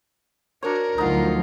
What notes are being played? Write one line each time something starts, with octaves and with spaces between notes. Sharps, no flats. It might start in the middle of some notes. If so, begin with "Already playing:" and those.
D4 F#4 A#4 C#5
D2 F3 F#3 D#4 F4 F#5